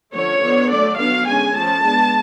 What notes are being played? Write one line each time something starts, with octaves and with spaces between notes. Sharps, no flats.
D3 F3 A3 C#4 C#5
D3 F3 B3 D4
D3 F#3 A3 D5
F#3 B3 D4 F5
D3 G#3 C#4 G#5
F3 A3 C#4 A5
G#3 B3 D4